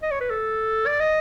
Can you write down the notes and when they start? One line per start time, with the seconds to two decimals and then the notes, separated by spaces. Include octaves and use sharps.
0.03 D#5
0.11 C#5
0.21 B4
0.30 A4
0.87 D5
1.00 D#5